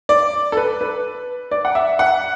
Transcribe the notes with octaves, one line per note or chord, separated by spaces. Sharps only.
D5
A4
B4
B4
D5
F#5
E5
F#5